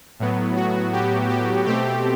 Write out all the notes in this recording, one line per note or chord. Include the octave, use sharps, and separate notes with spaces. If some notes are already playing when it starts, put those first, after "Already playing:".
A2 F#3 B3
F#4
G4
G4
B2 A3 C4 G4